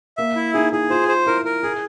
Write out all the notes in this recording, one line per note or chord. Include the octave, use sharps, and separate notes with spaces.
A#3 E5
E4
D#4 G#4
E4 G#4
F4 C5
C5
E4 A#4
A#4
E4 G#4